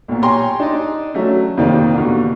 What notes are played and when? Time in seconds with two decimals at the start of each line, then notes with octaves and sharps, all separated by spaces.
0.08 B1 A#2
0.22 G4 C#5 G5 G#5 A#5 C6
0.60 D4 D#4 D5 D#5
1.14 F#3 A3 C#4
1.57 F2 C3 D#3 A#3 C5 D5
1.93 D#2 B2 D3 E3